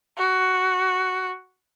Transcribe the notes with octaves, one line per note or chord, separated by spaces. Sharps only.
F#4